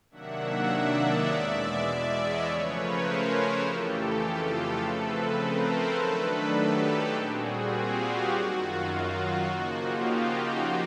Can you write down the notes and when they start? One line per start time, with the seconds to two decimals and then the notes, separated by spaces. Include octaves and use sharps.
0.11 C3 D#3 F#3 A#3 D4 E5 F#5
0.69 D5 E5
0.99 C#5 D#5
1.27 E2 B2 G#3 D5 E5
1.86 D5 E5
2.15 C#5 D#5
2.44 C#3 F3 A3 C#4 B4 C#5
2.74 A#4 C5
3.62 F2 C#3 E3 A3 G4 A4
4.20 F4
4.78 C#3 F3 A3 C4 A4 B4
5.37 A#4 C5
5.66 A4 B4
5.96 D#3 F#3 A3 D4
6.54 G4 A4
7.12 A#2 G3 C4 F#4 G#4
7.42 F#4 G#4
7.71 F4 G4
8.00 F#4
8.29 F#2 D#3 F#3
8.58 F4
8.88 F#4
9.17 F#4
9.46 C#3 F3 A#3 D#4
9.76 F4 G4